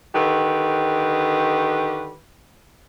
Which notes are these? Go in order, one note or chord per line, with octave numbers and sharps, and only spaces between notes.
D3 D#3 G4 B4